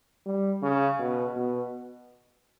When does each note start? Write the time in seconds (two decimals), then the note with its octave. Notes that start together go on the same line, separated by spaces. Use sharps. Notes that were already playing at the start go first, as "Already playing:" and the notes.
0.26 G3
0.63 C#3
0.99 B2
1.36 B2